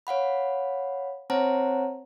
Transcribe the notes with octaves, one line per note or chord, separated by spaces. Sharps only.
C#5 F5 F#5 B5
C4 C5 C#5 F#5 A5 A#5